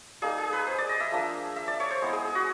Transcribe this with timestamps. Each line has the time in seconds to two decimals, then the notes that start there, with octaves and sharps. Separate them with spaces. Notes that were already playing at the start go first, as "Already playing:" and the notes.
0.22 G3 A#3 D#4 G#4
0.38 G#4
0.53 B4
0.66 C5
0.78 D5
0.89 D#5
1.00 E5
1.11 F3 A#3 D4
1.56 E5
1.68 D5
1.80 C#5
1.90 C5
2.02 G#3 B3 E4
2.13 G#4
2.25 G#4
2.35 F#4